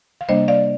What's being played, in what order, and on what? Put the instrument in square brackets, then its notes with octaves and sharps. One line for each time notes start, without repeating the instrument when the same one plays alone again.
[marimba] F5
C3 G3 A#3 D4 C5 D#5
D5 F5